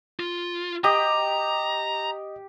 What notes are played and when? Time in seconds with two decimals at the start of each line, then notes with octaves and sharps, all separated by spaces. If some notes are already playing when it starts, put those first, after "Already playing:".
0.20 F4
0.84 G4 D#5 A#5 D#6